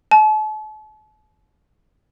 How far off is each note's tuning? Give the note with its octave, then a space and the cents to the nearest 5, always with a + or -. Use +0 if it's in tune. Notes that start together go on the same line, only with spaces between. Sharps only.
A5 -40